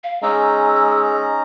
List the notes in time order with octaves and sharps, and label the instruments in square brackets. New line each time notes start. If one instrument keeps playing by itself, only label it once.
[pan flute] F5
[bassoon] G#3 [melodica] C#4 D#4 A#5 [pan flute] E6